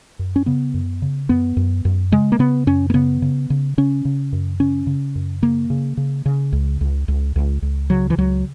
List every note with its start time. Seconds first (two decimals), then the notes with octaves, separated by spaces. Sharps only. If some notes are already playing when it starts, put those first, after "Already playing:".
0.19 F#2
0.36 C#4
0.46 C#3 B3
0.74 F#2
1.02 C#3
1.29 F#2 B3
1.57 F#2
1.85 F#2
2.12 C#3 G#3
2.32 A#3
2.39 C#3 B3
2.67 F#2 C#4
2.90 A#3
2.94 C#3 B3
3.22 C#3
3.50 C#3
3.78 C#3 C#4
4.05 C#3
4.33 F#2
4.60 C#3 C#4
4.87 C#3
5.15 F#2
5.42 C#3 A#3
5.70 C#3
5.97 C#3
6.26 C#3
6.53 C#2
6.81 C#2
7.08 C#2
7.36 C#2
7.62 C#2
7.90 C#3 F#3
8.10 E3
8.18 C#2 F#3